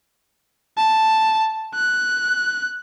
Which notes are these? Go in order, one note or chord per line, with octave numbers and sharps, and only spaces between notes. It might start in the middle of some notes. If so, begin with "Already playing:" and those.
A5
F#6